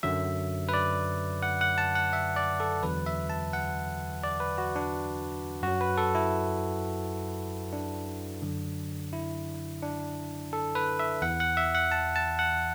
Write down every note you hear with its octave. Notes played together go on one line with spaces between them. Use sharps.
F#2 D3 F#3 E5
B4
D5
F#5
F#5
A5
F#5
E5
D5
A4
E2 D3 F#3 B4
E5
A5
F#5
D5
B4
F#4
D4
F#2 F#3 F#4
B4
A4
E4
D4
F#2 D3 F#3
E4
D4
A4
B4
E5
E2 E3 F#5
F#5
E5
F#5
A5
A5
F#5